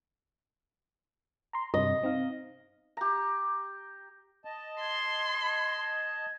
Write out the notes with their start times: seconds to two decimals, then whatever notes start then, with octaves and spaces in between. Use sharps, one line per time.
1.53 A#5 C6
1.74 G2 C3 D#5
2.03 C4 D#4 F5
2.97 G4 A#5
4.45 D#5 A5
4.81 C6 G#6